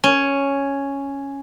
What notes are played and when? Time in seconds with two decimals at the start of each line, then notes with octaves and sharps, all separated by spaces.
0.04 C#4